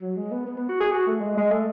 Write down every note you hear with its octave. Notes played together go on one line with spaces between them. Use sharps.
F#3
G#3
B3
B3
B3
F#4
G#4
F#4
A3
G#3
G#3
A3